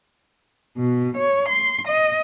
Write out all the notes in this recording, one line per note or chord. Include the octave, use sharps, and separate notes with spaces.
B2
C#5
C6
D#5